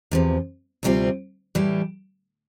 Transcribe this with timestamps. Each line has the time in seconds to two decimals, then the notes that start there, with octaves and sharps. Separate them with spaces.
0.11 E2 C3 F3
0.83 D2 C3 G3 C4 F4
1.55 A2 E3 G3